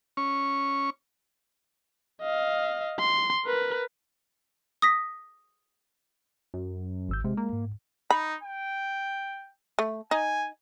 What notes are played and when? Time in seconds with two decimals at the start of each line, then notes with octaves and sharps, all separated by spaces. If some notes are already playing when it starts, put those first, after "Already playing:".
0.17 C#4 C#6
2.21 D#5 F5
2.99 C6
3.45 A#4 B4
4.82 D#6 A#6 B6
6.54 F#2
7.09 G#1 E6 G6
7.24 C3 G#3
7.37 A#3
7.53 G#2
8.10 D#4 B5
8.43 G5
9.79 A3
10.11 D#4 G#5